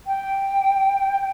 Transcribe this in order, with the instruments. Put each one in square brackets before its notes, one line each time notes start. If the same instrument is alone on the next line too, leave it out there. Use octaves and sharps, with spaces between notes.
[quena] G5